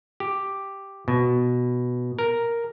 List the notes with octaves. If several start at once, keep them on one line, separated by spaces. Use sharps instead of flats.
G4
B2
A#4